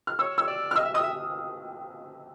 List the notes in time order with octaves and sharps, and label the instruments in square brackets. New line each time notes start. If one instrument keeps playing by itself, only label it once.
[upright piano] F6
[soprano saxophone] C#5 [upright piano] E6
[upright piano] E6
[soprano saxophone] D5
[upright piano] F6
[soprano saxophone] D#5 [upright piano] E6
[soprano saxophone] E5
[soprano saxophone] D#5 [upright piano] D#6
[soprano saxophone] E5